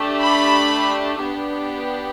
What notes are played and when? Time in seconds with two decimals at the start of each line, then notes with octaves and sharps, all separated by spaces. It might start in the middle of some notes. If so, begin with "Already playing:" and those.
Already playing: A3 D4 G4
0.21 B5
1.21 B3 D4 G4